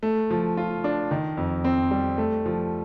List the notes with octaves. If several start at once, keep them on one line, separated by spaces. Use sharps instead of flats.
A3
F3
F4
D4
D#3
F2
C4
G3
A3
F3